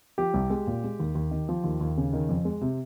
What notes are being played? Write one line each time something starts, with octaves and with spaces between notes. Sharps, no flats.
F3 G4
C2
G#3
A#2
G#3
D#2
D#2
D#3
F3
D#2
D#2
C#3
D#3
F2
G#3
C3